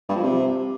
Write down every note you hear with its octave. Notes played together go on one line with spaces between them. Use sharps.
G2
F3
C3